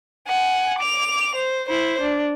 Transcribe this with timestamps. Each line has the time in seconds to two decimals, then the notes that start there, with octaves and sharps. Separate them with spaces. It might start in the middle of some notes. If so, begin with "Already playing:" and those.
0.28 F#5 G#5
0.79 D6 F7
1.36 C5
1.69 E4 C5
2.01 D4